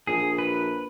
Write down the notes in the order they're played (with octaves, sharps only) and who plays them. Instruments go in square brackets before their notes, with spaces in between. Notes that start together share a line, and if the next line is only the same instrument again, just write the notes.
[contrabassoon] A#1 [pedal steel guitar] G#4
[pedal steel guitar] B4